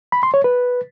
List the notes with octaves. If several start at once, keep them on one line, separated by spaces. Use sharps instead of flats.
B5
C6
C#5
B4